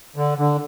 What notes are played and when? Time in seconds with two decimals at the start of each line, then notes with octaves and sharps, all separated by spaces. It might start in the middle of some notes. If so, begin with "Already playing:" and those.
0.16 D3
0.38 D3